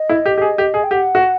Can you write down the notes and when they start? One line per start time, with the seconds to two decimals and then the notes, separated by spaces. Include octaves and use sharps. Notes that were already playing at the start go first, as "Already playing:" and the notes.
Already playing: D#5
0.09 E4
0.26 G4
0.38 G4
0.41 G#4
0.58 G4
0.74 G#4
0.84 G5
0.91 G4 F#5
1.15 F#4